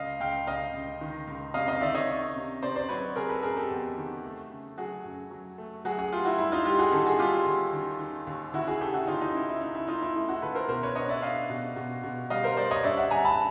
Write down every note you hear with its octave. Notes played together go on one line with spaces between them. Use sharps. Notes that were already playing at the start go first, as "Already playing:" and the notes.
Already playing: C#2 D#5 F5
C#2 F5 G5
C#2 D#5 F5
C#2
D#3
C#2
C3 D#5 F5
D#5 F5
D#3 D5 E5
C#5 D#5
D#3
C3
C3 C5 D5
C5 D5
F#3 B4 C#5
C3 G#4 A#4
A4 B4
C3 G#4 A#4
G4 A4
E2
D#3
A3
C#3
F#3 F#4 G#4
F#2
F#3
A3
F#3 F#4 G#4
F#4 G#4
A3 F4 G4
E4 F#4
G3 E4
D#4 F4
G3 F4 G4
F#4 G#4
D#3 G4 A4
F#4 G#4
G3 F4 G4
D#2
D#3
D#3
D#2
D#2 E4 F#4
F#4 G#4
C#3 G4 A4
E4 F#4
D#2 D#4 F4
D#4
C#3 E4
E4
C#3 D#4
E4
A3 D#4 F4
E4
A3 E4
E4 F#4
D#2 A4 B4
A#4 C5
B2 A#4 C5
B4 C#5
D4 C#5 D#5
D5 E5
D4 D#5 F5
B2
B2
B2
G3 D#5 F5
A#4 C5
G3 C5 D5
C#5 D#5
G2 D5 E5
E5 F#5
G2 G#5 A#5
A5 B5